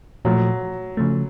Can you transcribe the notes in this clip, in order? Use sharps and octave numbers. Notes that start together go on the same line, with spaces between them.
A#2 F3 F#3 A3
C#3 F3 A3